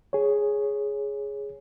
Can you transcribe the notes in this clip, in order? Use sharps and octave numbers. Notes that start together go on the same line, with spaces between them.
G#4 C#5